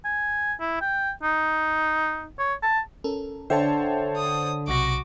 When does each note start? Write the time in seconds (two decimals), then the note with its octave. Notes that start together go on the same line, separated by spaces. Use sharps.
0.05 G#5
0.60 E4
0.81 G5
1.23 D#4
2.39 C#5
2.63 A5
3.04 C#4 A4 A#4
3.50 D3 C5 C#5 E5 G5 A5
4.16 D#6
4.68 B1 C3 F#4 D6 A#6